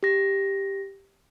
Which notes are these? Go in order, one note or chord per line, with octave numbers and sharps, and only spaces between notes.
G4 A#6